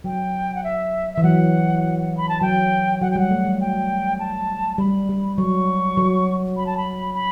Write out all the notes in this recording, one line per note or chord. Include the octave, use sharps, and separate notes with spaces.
F#3 G5
F#5
E5
E3 E5
F#3 F#5
B5
A5
F#3 G5
F#3 F#5
G5
G3
F#5
A3
G3
G5
A5
G3 B5
G3
F#3 C#6
F#3
B5
A5
B5
B5